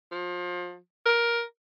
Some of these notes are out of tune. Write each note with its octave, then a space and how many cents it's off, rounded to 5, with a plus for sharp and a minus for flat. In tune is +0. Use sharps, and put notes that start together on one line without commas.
F3 +30
A#4 +15